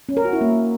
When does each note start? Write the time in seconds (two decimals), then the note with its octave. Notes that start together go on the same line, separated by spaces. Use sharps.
0.09 C#4
0.17 A#4
0.25 F#4
0.33 E4
0.41 A#3